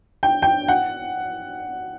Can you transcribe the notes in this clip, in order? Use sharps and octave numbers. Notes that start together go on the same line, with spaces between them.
G5
G5
F#5